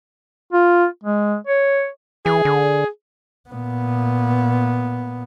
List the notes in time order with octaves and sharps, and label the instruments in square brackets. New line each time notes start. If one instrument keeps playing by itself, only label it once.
[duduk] F4
G#3
C#5
[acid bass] E3 [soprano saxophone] G#4
[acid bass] D3
[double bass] A#2 B3